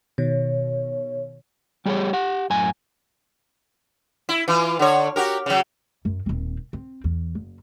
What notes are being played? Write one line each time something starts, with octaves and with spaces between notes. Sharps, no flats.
B2 D#3 C#5
G3 G4 G#4 C5 C#5
G4 F#5
F#2 A2 G#5
E4
E3 F4
D3 C#5
F#4 G4 A#4
C#3 F#3
F#2
D#1 C4
C4
E2
F#1